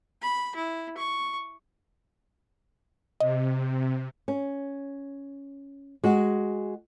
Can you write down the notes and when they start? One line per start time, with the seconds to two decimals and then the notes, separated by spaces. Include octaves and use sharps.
0.22 B5
0.56 E4
0.97 C#6
3.20 C3 D#5
4.28 C#4
6.04 G#3 F#4